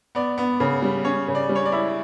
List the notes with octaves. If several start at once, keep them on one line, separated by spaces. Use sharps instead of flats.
B3 D5
B3
C#3
G3
C#4 C#5
C#3
D5
G3
C#5
D5
E4